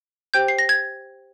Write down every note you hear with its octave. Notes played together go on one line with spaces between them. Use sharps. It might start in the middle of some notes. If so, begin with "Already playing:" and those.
G4 C5 G5 G6
C7
A#6
G#6